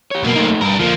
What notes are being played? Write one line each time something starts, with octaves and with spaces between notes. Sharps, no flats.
G4 C#5
B1 B2 A#3
A3 D#4
G2 G3 A#4
D3 F3 A#3